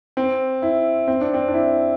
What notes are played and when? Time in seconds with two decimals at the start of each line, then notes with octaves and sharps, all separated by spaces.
0.17 C4
0.62 E4
1.08 C4
1.21 D4
1.34 C4
1.48 D4
1.54 E4